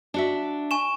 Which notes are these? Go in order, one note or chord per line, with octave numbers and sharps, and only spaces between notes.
D4 F#4 E5
G#5 C#6 E7